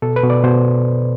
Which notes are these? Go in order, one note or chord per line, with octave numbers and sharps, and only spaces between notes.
B2 A4
B4
B2
D5
B2 C5